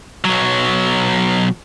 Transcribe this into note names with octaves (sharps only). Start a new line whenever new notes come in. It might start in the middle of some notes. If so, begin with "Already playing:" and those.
B1 F#3